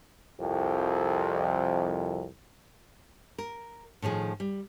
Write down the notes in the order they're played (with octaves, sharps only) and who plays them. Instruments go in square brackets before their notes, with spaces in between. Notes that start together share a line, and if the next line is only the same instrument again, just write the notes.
[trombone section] C2 F2
[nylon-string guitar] A#4
A2 D#3 F3 G#4
G3